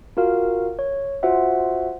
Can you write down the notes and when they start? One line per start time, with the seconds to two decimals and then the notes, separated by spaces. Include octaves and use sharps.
0.17 F4 F#4 A#4 F5
0.79 C#5
1.23 F4 F#4 C5 E5 F#5